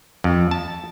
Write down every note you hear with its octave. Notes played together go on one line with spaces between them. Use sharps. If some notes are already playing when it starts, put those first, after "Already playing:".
F2
A5